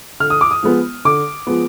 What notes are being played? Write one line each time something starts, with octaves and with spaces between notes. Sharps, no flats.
D3 F6
D#6
D6
D#6
F3 G#3 B3
D3 D6
F3 G#3 B3